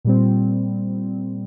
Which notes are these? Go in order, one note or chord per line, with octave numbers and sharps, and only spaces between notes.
A#2 G3 C4